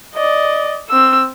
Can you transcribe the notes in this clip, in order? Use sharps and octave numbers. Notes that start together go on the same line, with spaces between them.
D5 D#5
C4 E6